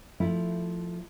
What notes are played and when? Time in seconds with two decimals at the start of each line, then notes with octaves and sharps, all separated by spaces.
0.20 F3 A3 E4